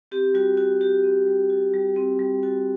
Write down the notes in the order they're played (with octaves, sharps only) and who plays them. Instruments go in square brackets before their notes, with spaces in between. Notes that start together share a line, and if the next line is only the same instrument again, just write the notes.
[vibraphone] C4 G4
G3 F#4
F#4
G3 G4
C4
G3
F#4
G3
C4
G3
F#4